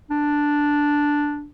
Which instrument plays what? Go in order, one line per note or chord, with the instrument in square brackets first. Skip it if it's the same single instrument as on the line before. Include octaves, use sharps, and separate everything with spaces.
[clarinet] D4